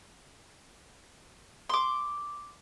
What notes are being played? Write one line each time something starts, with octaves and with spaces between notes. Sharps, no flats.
C6 D6